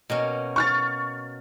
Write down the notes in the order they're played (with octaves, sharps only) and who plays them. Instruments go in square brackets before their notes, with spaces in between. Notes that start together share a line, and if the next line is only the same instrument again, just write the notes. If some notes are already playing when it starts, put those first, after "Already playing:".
[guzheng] B2 A#3 C#4
[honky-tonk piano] C#6 F6 A6